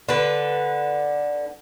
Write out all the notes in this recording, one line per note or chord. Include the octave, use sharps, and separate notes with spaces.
D3 B4